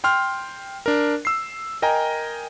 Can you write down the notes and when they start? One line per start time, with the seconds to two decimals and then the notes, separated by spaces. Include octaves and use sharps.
0.04 G5 C6 F6
0.86 D4 A#4
1.25 E6 C7
1.82 A#4 D#5 G5 G#5 A#5